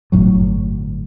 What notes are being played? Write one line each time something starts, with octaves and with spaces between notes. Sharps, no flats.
G1 A2 F#3